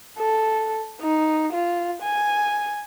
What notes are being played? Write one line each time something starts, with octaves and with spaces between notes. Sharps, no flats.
A4
D#4
F4
G#5